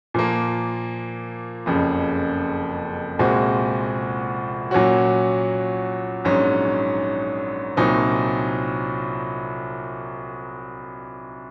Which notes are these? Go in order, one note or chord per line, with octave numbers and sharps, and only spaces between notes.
A#2 F3 A#3
F#1 F2 C#3
C2 A#2 G#3 C4 F#4
A#2 F#3 C#4 F#4
A#1 G#2 F#3 C#4
C2 A#2 F#3 C4 D#4